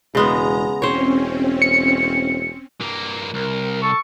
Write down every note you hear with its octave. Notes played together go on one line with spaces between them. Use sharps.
E1 C#3 G#3 B3 A#5
E1 C4 C#4 C5 C#5
C#7
G2 A#3
C2 A#4
A4 C#6